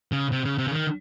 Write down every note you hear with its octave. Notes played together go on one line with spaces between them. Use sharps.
C#3
C3
C#3
C3
C#3
D#3